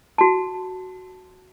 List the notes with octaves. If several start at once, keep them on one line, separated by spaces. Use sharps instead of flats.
F#4 A5